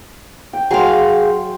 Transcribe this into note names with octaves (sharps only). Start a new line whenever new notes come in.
G5
F#3 G#4 F5 G5 C6